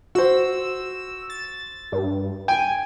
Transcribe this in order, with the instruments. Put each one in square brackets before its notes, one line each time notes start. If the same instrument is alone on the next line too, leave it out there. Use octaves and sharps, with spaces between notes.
[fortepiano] F#4 C5 [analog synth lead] E6
[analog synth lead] A6
G2
[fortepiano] G5 [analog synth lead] G#5